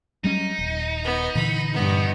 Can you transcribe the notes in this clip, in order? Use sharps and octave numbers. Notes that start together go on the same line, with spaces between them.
F#3 G3 C#4 D#4
D#1
B3
A#2 D3 E3 B5
G2 B3